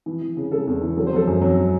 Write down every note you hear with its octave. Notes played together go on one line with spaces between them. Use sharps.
E3
E3
C#3
C#3 A4
E2
E3
F#3 A4
C5
F#3 A4
F#2
F#3